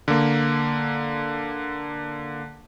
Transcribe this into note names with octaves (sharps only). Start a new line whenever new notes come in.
D3 A#3